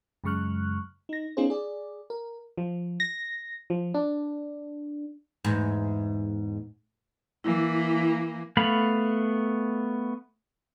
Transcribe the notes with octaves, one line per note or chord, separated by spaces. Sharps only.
F#2 C#3 G#3 C#6 F6 F#6
D#4 A#6
B3 C#4 D#4 F4 G#4 C5
G#4 D5
A#4
F3
A#6
F3
D4
E2 G#2
E3 A#3 E4
A3 B3 F5 B5